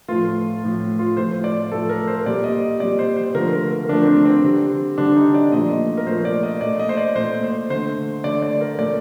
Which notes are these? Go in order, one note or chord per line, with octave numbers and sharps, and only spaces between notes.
A2 F3 A3 F4
A2 F3 A3
F4
A2 F3 A3 C5
D5
A2 F3 A3 A4
A#4
C5
A#2 G3 D5
D#5
D#5
A#2 G3 D5
C5
C5
D3 F3 A3 A#4
A#4
A#4
D3 F3 A3 D4
C4
D4
C4
D3 G3
D3 G3 D4
D#4
D5
A#2 F3 A3 D#5
A#4
A#2 F3 A3 C5
D5
D#5
A#2 A3 D5
D#5
C5
D5
A#2 A3 C5
C5
D3 A3 C5
D3 A3 D5
D5
A#4
A#2 A3 D5